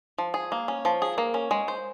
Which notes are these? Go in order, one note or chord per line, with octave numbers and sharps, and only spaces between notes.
F3
G#4
A#3
C#4
F3
G#4
A#3
C#4
G#3
C5